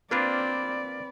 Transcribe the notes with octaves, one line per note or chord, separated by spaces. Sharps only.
A#3 C4 D4 F4 B4 D5